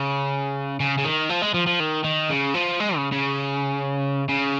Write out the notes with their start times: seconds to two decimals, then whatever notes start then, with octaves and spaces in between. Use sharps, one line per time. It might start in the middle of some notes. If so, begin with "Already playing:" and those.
Already playing: C#3
0.80 C#3
0.98 C#3
1.05 D#3
1.30 F3
1.42 G#3
1.54 F3
1.67 F3
1.80 D#3
2.04 D#3
2.30 C#3
2.54 F3
2.80 G#3
2.96 C#3
3.12 C#3
4.29 C#3